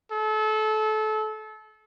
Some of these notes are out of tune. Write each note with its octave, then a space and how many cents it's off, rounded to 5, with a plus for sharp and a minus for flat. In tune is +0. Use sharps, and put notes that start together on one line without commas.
A4 -30